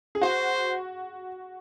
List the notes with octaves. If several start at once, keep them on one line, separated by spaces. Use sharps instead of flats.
G#4
F#4 C5